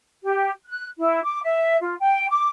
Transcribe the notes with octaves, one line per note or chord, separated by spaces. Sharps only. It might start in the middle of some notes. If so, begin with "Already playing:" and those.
G4
F#6
E4
D6
E5
F4
G5
D6